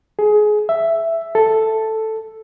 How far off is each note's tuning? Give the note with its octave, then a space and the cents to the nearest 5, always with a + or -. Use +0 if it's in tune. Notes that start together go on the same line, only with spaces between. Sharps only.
G#4 +20
E5 +5
A4 +0